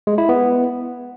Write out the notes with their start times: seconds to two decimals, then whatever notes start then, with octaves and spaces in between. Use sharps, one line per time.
0.07 G#3
0.18 E4
0.29 B3